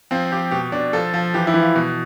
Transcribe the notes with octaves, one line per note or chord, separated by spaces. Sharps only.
F3 C4
F3 G4
B2 G4
B2 D4
F3 A4
F3
E3 G4
E4
E3
F4
B2